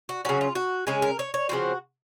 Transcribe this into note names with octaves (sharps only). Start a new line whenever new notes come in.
F#4
C#3 F#3 C#4 F#4
F4
F#4
C#3 G#3 C#4 G#4
A#4
C#5
C#5
C#3 F3 C4 F#4